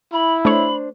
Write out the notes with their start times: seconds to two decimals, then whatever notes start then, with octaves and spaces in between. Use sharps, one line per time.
0.13 E4 B5
0.45 A3 D4 C5 C#5 B5